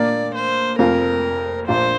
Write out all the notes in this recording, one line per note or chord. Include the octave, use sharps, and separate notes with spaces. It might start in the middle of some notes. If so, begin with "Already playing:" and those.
Already playing: A#2 A#3 D4 D5
C5
F1 F2 F3 C4 F4 A#4
A#1 A#2 A#3 D4 F4 C5